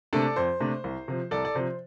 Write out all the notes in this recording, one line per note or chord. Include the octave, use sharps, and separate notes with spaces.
C3 A3 D4 A4 D5
F2 C5
C3 A3 D4
C2
C3 F3
C2 A4 D5
D5
C3 F3 C5